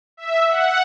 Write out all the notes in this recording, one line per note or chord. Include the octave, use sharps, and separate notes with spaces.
E5
F#5